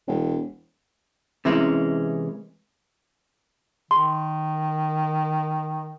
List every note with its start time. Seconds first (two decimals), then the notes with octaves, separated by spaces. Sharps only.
0.07 E1
1.45 C3 E3 G#3 A#3 C#4
3.91 D#3 C6